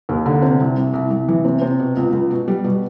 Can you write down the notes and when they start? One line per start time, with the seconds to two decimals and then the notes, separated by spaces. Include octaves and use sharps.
0.09 D#2
0.26 D3
0.42 C3
0.60 C2
0.77 C2
0.93 C2
1.11 C2
1.28 E3
1.45 C3
1.62 C3
1.79 B2
1.97 C#2
2.13 C#2
2.30 B2
2.48 G3
2.64 B2